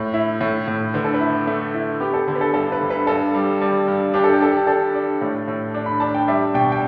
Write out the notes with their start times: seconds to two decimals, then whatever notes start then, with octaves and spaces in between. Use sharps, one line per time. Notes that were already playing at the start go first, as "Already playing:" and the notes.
Already playing: A2
0.13 E4
0.41 A2
0.68 A2
0.94 D3 B4
1.04 A4
1.14 B4
1.20 E4
1.47 A3
1.74 E4
2.00 B3 G4
2.14 A4
2.28 D3
2.35 B4
2.41 A4
2.54 G2 A4
2.72 B4
2.81 D3
2.90 B4
3.07 G2 A4
3.34 G3
3.61 G3
3.88 G2
4.14 D4 G4
4.24 A4
4.33 G4
4.40 D4 A4
4.51 G4
4.67 D4 A4
4.94 D4
5.21 A2
5.48 A2
5.74 D4
5.86 B5
6.00 D4 A5
6.15 G5
6.28 G3 E5
6.54 B2 G5
6.72 G5